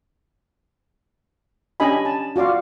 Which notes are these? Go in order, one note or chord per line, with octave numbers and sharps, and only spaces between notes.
C#4 D4 G4 D#5 G#5 B5
A5
F4 F#4 D5 F5